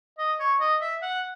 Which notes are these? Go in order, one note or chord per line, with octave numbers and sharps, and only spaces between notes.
D#5
C#5
D#5
E5
F#5